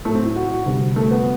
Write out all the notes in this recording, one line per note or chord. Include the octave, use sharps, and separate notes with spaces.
A2 F#3 A3
C4
E4
F#4
F#4
D2 C3 G3
A3
B3